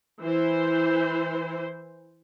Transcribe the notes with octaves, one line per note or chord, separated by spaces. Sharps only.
E3 E4 C5